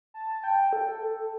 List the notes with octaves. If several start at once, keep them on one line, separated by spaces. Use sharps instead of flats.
A5
G5
A4
A4